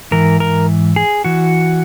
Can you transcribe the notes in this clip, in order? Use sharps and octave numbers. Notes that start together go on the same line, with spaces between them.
G#2 E3 A#4
A#4
G#4
E3 F#4